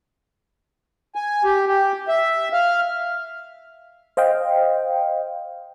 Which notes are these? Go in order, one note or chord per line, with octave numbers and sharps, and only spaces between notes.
G#5
G4
G4
E5
F5
C5 D#5 F5 G5